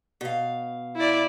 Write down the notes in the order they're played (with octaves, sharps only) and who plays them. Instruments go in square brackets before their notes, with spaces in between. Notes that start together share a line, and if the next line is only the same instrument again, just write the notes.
[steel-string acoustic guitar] B2 F5
[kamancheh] E4 D5